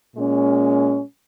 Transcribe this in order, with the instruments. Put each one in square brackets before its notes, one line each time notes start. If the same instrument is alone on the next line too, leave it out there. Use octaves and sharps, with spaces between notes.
[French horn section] A#2 G#3 C#4